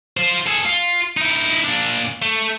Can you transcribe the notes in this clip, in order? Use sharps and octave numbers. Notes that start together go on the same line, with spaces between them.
F4 C5
G#4 A4
F4
D#4 E4
A#2 D4
A3